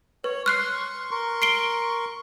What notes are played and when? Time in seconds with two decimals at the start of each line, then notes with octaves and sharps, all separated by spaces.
0.24 B4 C#5
0.46 C6 C#6 F6 F#6 C7
1.11 A#4 C6 C#6
1.42 C7 D7 G7